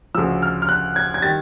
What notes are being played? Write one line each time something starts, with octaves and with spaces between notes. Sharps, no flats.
D2 C#3 F3 E6
F6
F6
F#6
G#6
G#6
D#3 G3 A6